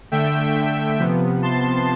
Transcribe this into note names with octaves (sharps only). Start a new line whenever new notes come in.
D3 A3 E5 G5
E5 G5
C3 F3 B3
A5 C6